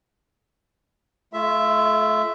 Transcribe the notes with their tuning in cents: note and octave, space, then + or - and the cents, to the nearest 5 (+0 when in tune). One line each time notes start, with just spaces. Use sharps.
A3 -35 F4 -35 E5 +0